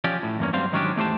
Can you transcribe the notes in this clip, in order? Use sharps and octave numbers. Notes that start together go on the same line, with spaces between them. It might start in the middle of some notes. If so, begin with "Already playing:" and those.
F3 C#4 G4 D5
A2
E2 G2 A#3 C#4
G2 F#3 G3 C4 C5 F5
G#2 D#3 F#3 C#4 D4 G4
E2 A3 G4 C5 A5